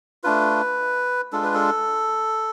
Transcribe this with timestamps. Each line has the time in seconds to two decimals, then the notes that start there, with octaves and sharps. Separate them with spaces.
0.24 A3 D4 F4 B4
1.32 G#3 D4 F4 A4
1.43 B4
1.54 A4